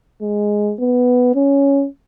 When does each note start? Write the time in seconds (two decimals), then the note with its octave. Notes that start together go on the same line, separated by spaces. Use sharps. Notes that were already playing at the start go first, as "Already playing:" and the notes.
0.22 G#3
0.79 B3
1.35 C#4